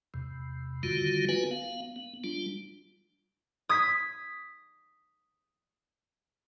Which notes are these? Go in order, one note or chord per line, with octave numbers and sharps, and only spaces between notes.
E2 C3
D3 D#3 G3 F4 F#4
B3 F4 F#4 B4 G#5
B3 F5
B3
G3 D4 F4
D#6 G#6 B6